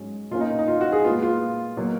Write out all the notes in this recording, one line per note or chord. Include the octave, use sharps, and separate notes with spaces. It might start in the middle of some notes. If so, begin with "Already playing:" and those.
Already playing: G#2 F#3 C#4
B2 A#3 C#4 F4
D#4
D#4
F4
F#4
G#4
A#2 G#3 B3 F4
F4
B2 F#3 A#3